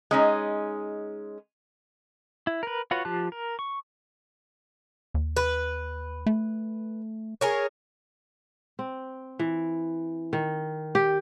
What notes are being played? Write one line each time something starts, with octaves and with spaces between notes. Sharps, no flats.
G#3 C#4 D#4
E4
A#4 B4
F4 F#4 B4 C#5 F#5
F3 F4 G4 A5 F#6
A#4
C#6
D#2
B4
A3
G#4 A#4 C#5
C4
E3
D#3
G4